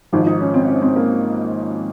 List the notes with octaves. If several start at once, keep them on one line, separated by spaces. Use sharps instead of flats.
G#1 G#2 F3
D#4
C#4
C4
C#4
C4
A#3